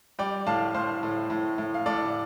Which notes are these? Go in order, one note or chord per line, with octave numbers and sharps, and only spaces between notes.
G3 D5 G5
A2 F5 A5
A2 C5 F5
A2
A2
A2
F5
A2 A4 D5